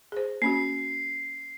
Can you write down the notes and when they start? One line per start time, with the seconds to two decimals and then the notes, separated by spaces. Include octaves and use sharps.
0.12 G#4 C5
0.42 A#3 C#4 F#4 C7